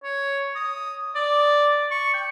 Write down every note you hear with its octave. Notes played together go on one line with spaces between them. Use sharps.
C#5
D#6
D5
C#6
G5